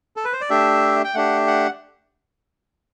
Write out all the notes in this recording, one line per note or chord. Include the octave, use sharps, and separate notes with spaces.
A4
B4
C5
D5
A3 D4 G4 E5
G5
A3 D4 G4 F#5
F#5